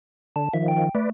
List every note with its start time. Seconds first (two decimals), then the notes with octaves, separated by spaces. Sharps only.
0.36 D3 A5
0.54 D#3 F3 E5
0.68 G5
0.95 A3 B4 D5